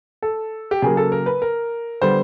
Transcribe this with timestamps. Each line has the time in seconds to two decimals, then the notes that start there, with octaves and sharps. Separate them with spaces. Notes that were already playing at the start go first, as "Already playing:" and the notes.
0.23 A4
0.71 G4
0.82 C#3 F#3 A#3 G#4
0.97 A4
1.12 A#4
1.26 B4
1.42 A#4
2.01 D3 G3 B3 C5